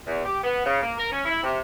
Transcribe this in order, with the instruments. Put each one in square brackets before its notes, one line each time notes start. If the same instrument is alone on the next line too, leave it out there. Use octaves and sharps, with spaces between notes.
[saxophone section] E2
G4
B3
C#3
A#3
A#4
C#4
E4
C3